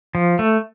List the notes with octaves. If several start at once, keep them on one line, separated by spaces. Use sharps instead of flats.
F3
A3